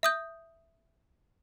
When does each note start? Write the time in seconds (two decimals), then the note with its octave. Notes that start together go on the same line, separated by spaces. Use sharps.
0.03 E5 D#6 G6